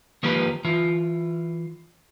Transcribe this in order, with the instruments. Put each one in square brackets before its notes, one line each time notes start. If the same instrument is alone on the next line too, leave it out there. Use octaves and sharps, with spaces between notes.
[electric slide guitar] D#3 F3 A#3 G4 A#4 B4
E3 F4